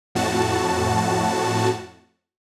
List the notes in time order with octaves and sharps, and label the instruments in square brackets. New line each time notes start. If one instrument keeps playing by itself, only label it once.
[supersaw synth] F2 A2 F#4 A5